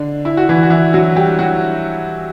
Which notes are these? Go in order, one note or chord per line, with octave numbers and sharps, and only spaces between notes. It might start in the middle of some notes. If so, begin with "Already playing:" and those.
Already playing: D3 D4
E4
F#4
E3 E4
F#4
E3 E4
F#3 F#4
G3 G4
F#3 F#4